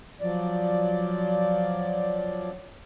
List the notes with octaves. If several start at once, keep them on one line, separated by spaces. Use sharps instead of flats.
F3 F#3 D5